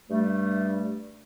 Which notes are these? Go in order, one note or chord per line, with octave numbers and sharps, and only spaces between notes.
G2 G3 A3